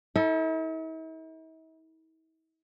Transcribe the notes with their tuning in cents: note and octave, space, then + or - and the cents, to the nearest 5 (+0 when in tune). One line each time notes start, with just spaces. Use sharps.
E4 -45 A4 +0